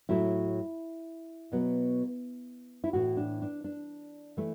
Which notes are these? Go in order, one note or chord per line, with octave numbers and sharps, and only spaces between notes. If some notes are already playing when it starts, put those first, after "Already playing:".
A2 F#3 A3 E4
B2 F#3 B3
E4
A2 E3 A3 F#4
D4
D4
D4
E3 A3